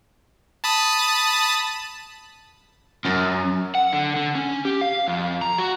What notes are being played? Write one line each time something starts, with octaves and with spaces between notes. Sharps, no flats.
A5 B5 D#6
F#2
F#5
D3
D3
C#4
G4
F5
F2
A#5
F#4